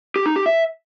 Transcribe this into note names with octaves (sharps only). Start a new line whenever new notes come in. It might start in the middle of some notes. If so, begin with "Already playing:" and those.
G4
D#4
G4
E5